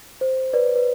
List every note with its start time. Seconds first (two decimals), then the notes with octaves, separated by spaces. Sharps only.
0.21 C5
0.53 B4 D5
0.76 B4